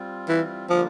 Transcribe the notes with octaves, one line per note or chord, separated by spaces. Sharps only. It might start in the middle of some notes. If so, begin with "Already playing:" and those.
Already playing: G3 C4 F4
E3
D3 F3 G3 A#3 D4 F4